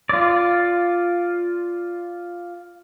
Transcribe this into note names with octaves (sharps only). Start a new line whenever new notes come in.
F4 D5